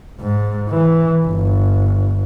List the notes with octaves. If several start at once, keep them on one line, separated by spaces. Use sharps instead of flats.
G#2
E3
G1